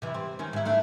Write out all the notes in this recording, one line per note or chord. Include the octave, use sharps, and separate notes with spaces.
C3 E3
C4
D#3 C#4
G#2 E4
A3 D4 E4